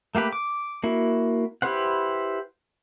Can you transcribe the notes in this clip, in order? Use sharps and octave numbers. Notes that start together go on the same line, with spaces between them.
A3 A#3 G4 B4
D6
A#3 E4 F#4
E4 G4 B4 C5 F#5